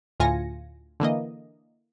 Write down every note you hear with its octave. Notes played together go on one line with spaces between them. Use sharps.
D2 A2 F4 G#5 A#6 C#7
D3 E3 A#3 D#5